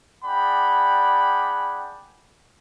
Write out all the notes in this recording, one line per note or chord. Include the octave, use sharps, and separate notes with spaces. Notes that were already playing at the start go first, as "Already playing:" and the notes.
D4 G#4 D5 F#5 G5 B5